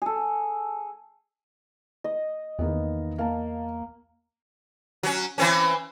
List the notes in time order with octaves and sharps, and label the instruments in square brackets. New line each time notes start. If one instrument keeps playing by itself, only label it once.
[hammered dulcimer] G#4 A4
[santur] D#5
[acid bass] E2 [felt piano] D#3 A#3 B3
[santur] A#3 [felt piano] F5 A5
[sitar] F#3 C#4
E3 C4 C#4